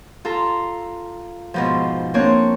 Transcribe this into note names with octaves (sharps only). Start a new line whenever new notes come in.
F4 A4 A#5
G#2 B2 F3
A#3 C4 D4 C#5